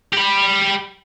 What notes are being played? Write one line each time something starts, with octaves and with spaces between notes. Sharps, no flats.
G4 B5